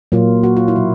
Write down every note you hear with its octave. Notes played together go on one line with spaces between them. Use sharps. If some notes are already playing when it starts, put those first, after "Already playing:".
A#2 F#3 A#3 F4
F#4
F4
E4
B2 F#3 A#3